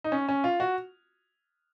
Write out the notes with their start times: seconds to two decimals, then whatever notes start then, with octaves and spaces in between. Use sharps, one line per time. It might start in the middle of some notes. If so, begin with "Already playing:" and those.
0.04 D#4
0.12 C#4
0.29 C#4
0.44 F4
0.60 F#4